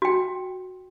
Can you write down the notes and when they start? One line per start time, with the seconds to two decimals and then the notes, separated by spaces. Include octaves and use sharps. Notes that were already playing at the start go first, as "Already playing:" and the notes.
0.02 F#4 G5